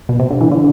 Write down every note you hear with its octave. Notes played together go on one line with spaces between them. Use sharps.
B2
C3
D3
E3
D3